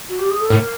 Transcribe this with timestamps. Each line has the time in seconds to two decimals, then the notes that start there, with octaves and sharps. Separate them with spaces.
0.09 F#4
0.19 G4
0.30 G#4
0.40 A4
0.50 A2 A#4